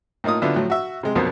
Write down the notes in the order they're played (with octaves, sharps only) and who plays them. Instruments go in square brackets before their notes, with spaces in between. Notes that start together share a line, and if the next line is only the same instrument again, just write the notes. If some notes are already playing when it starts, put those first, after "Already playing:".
[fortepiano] A2 A#3 D#4 F4 D#6
D3 F#3 B3 D4 E4 F4
A2 F3 F#3
F#4 E5
C3 G#3
B1 F2 B2 A#3 B3 C5